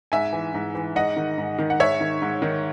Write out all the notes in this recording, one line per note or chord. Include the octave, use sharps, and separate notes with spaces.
G#2 E5 G#5
E3
G#2
E3
G#2 D#5 F#5
D#3
G#2
D#3
F#5
G#2 C#5 E5
D#3
G#2
D#3